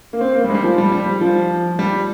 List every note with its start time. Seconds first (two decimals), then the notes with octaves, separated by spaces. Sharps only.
0.13 A#3
0.21 C4
0.35 A#3
0.44 G3
0.50 G#3
0.54 G3
0.63 F3
0.78 G3
0.92 G3
1.21 F3
1.79 G3